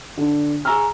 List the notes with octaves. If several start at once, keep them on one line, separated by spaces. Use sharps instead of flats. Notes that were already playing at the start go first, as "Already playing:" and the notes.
D3 D4
G#4 G#5 A#5 C#6 E6 F6